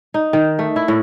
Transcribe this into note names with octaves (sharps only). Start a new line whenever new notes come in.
D#4
D#3
A3
E4
A2